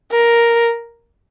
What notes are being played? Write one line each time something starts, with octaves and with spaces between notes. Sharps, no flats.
A#4